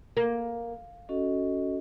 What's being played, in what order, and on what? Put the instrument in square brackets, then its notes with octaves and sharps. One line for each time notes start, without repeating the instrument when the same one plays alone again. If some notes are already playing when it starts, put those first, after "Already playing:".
[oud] A#3
[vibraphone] C#4 F#4 A4 D#5